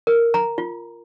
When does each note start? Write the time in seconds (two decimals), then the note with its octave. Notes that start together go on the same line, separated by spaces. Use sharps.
0.07 A#4
0.34 A#5
0.58 F4